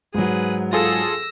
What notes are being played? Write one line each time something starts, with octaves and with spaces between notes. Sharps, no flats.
G#2 F#3 G#4 B4
F4 G#4 A4 E6 A#6